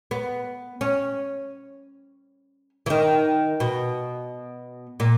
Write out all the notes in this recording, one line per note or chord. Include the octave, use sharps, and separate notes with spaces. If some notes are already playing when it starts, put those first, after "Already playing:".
B3
C#4
E3
D#3
B2
A#2